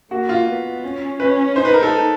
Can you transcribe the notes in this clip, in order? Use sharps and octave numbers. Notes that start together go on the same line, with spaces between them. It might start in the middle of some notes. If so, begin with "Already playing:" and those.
A#3 F#4
F4
B3
C#4
C#4 B4
D#4 C5
B4
A#4
A4